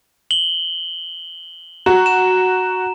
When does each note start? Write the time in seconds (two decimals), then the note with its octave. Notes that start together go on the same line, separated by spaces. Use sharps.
0.31 F#7 G7
1.86 F#4 A#5
2.06 E7